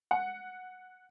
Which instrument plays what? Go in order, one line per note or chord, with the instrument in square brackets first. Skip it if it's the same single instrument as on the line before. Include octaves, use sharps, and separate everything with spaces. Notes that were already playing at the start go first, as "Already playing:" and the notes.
[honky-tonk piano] F#5